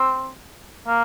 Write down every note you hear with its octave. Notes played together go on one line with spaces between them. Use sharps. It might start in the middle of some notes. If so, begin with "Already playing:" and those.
Already playing: C4
A#3